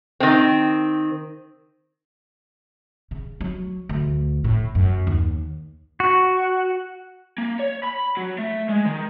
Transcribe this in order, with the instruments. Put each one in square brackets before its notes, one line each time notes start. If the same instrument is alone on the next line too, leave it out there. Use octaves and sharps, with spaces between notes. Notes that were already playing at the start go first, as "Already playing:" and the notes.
[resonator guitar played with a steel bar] D#3 C4
[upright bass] C#3
F#3
D2
A2
F#2
D#2
[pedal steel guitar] F#4
[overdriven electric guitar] A#3
C#5
B5
F#3
A3
G#3
D#3